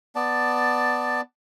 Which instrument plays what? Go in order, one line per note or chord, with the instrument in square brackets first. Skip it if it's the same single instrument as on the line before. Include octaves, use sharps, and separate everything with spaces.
[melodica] B3 D5 A5